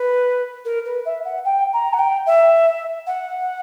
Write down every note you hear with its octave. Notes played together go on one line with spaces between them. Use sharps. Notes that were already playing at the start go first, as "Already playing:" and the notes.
Already playing: B4
A#4
B4
E5
F#5
G5
A#5
F#5
G5
E5
F#5